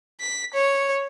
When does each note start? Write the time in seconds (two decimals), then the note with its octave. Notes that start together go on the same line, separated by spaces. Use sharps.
0.20 B6
0.54 C#5